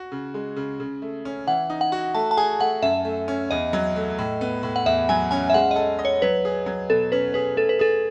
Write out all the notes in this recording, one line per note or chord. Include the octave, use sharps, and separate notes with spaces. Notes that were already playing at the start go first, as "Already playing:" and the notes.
Already playing: F#4
C#3
G#3
C#3
C#3
A3
C#4
E3 F#5
D#4
F#5
F#4
A3 A5
A5
G#4 G#5
A3 F#5
F#2 E5
A3
C#4
E2 D#5
F#3
A3
A2
B3
A2
F#5
E2 E5
F#3 G#5
C#4 G#5
E5
G#3 F#5
A4 D#5
D#5
C#5
F#3 B4
G#4
F#3
B2 A4
C#4 B4
G#4 B4
A3 A4
B4
G#4 A4